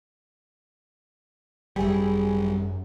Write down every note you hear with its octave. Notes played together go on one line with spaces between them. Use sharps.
G#1 F#2 G3 E4 G#4